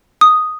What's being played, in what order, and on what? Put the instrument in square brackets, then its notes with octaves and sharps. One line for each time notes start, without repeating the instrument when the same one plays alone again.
[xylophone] D#6